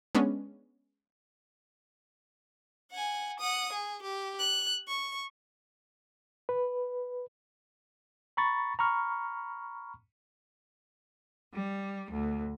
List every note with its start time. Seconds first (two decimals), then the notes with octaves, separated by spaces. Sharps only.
0.15 G#3 B3 C#4 D4
2.91 F#5 G#5
3.40 F#5 D#6
3.72 G#4
4.02 G4
4.39 F#6
4.88 C#6
6.49 B4
8.37 A#5 B5 C#6 A6
8.79 A#5 B5 C#6 F6
11.52 G3
12.11 D2